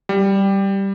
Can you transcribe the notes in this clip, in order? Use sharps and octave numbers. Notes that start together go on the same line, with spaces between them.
G3